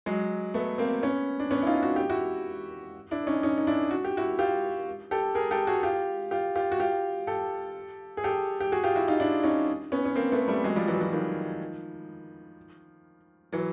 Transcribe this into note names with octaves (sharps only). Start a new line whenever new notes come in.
F#3 G#3
A3 B3
A#3 C4
B3 C#4
D4
B3 C#4
E4
D#4 F4
F#4
G4
E4 F#4
D4 E4
C#4 D#4
C#4 D#4
D#4
D4 E4
F#4
G4
E4 F#4
F4 G4
G4 A4
G#4 A#4
G4 A4
F#4 G#4
F4 G4
F4 G4
F4 G4
F#4
F4 G4
G4 A4
G#4
G4 A4
G4
F#4 G#4
F4 G4
E4 F#4
D#4 F4
D4 E4
C#4 D#4
B3 C#4
C#4
A#3 C4
A3 B3
G3 A3
F#3 G#3
F3 G3
E3 F#3
E3 F#3
D#3 F3
E3 F#3